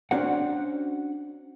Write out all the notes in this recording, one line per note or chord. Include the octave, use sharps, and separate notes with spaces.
C#4 D4 F#4 C5 F#5